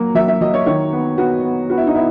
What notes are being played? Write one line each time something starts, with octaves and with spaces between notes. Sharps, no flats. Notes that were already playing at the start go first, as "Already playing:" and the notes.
Already playing: F#3 A#3
F#3 E5
E5
F#3 D#5
C#5
D#3 C#5
B3
B3 F#4
B3
B3 F#4
E4
D#4
B3 E4